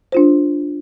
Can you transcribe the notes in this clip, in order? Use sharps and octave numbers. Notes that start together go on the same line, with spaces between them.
D4 F4 C5